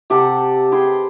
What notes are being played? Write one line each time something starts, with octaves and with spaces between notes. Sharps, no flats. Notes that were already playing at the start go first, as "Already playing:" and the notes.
C3 G4 A4 F#5
G#4 B4 C5 G5